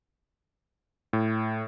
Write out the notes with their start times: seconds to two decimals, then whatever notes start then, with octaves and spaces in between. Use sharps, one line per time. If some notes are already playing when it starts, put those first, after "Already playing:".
1.13 A2